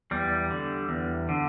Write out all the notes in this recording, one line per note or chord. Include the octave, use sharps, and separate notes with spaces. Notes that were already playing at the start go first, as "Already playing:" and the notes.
E2 G3
D3
E2
D3